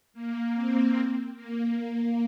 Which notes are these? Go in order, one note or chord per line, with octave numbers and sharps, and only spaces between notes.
A#3
C4
A#3